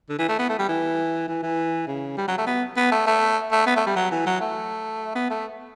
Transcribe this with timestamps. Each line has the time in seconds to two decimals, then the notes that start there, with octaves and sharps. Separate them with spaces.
0.09 D3
0.19 E3
0.28 A3
0.39 B3
0.49 A3
0.59 G3
0.68 E3
1.28 E3
1.43 E3
1.87 C#3
2.18 G3
2.28 F#3
2.38 A3
2.47 B3
2.77 B3
2.92 A3
3.07 A3
3.52 A3
3.66 B3
3.76 A3
3.87 G3
3.96 F#3
4.11 E3
4.26 F#3
4.41 A3
5.15 B3
5.30 A3